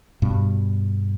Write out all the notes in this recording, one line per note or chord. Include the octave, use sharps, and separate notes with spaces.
G2 B2